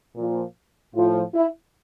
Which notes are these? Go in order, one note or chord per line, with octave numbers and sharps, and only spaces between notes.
A#2 F3
A2 F3 F4
E4